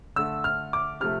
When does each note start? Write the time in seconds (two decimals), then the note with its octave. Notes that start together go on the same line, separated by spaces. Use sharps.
0.16 D3 A3 E6
0.44 F6
0.73 D6
1.00 C3 F3 A3 F6